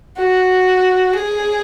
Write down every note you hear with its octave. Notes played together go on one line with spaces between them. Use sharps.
F#4
G#4